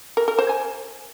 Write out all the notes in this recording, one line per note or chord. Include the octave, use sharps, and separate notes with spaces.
A#4
A#4
C5
G#5